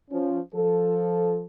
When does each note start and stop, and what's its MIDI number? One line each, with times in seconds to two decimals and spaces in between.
0.10 0.39 53
0.10 0.39 61
0.54 1.45 53
0.54 1.45 69